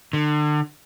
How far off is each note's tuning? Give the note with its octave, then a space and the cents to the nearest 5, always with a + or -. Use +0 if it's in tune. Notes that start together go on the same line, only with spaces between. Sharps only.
D3 +35